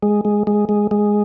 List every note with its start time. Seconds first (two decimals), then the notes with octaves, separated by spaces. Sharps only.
0.03 G#3
0.25 G#3
0.47 G#3
0.69 G#3
0.91 G#3